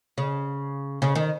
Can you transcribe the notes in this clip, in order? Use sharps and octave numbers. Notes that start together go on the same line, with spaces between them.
C#3
C#3
D#3